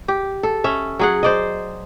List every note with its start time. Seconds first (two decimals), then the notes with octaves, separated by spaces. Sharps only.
0.08 G4
0.43 A4
0.64 C#4 E5
0.99 F#3 G#4 F#5
1.23 C5 D5 D#5